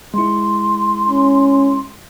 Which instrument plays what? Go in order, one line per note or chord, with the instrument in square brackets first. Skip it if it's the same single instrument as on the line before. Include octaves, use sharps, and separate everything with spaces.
[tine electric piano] G#3 E4 [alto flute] C6
[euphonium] C#4